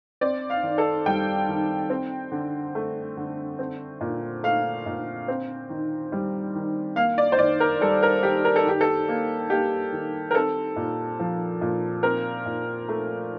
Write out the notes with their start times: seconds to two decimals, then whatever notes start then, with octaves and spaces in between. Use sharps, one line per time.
0.21 C4 D5
0.50 F5
0.63 D#3
0.78 A4
1.06 G3 G5
1.48 D#3
1.90 C4
2.32 D3
2.75 A3
3.17 D3
3.59 C4
4.01 A#2
4.43 A3 F5
4.86 A#2
5.28 C4
5.69 D#3
6.12 G3
6.55 D#3
6.96 A#3 F5
7.18 D5
7.32 C5
7.39 D#3 D5
7.60 A#4
7.81 G3 A4
8.03 A#4
8.23 D#3 G4
8.45 A#4
8.56 A4
8.65 D#3 G4
8.81 A4
9.08 A#3
9.50 A#3 G4
9.93 D#3
10.31 A#4
10.35 C4 A4
10.76 A#2
11.19 F3
11.61 A#2
12.03 C4 A#4
12.46 A#2
12.89 A3